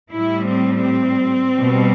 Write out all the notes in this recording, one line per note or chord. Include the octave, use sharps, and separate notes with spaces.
A2 G3 E4
C4
C4
B2 G3